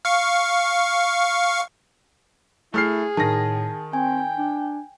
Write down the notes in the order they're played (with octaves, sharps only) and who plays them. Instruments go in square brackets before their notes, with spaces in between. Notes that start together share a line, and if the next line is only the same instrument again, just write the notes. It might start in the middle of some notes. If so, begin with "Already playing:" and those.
[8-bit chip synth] F5 C#6
[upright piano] A3 F6 C7 [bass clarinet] E4 [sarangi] G#4
[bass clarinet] A2 [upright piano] D#3 A#6 [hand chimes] A5
[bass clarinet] C4 [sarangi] G5 [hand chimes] G#5
[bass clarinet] D4